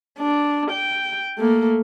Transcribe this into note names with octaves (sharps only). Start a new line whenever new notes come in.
D4
G5
A3 A#3